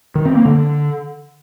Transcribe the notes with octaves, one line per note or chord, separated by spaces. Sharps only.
D#3
C4
A#3
D3